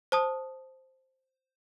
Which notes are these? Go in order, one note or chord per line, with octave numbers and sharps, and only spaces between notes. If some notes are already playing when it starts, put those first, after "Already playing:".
C5 A5 D#6